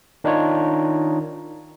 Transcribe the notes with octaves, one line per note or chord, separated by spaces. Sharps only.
D#3 D4 D#4 F4 C#5